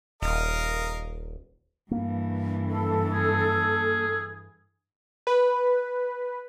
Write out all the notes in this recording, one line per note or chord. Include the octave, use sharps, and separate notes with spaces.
D#1 A#4 D#5 F5
G2 E3 A#3
A4
G#4
B4